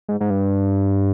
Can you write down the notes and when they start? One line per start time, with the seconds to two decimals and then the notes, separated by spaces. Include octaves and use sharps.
0.09 G#2
0.21 G#2
0.30 G2